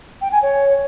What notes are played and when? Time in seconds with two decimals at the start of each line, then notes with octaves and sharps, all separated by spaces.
0.21 G5
0.32 G#5
0.42 C#5